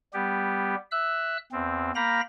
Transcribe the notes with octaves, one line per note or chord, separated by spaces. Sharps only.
G3 B3 G4
E5 E6 F#6
E2 C4
A#3 F5 G5 A#5 B5 A#6